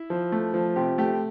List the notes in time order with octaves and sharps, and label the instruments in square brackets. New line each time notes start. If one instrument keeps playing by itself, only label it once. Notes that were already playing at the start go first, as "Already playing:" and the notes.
Already playing: [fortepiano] E4
F3
A3
F3
C3 G4
A3 G4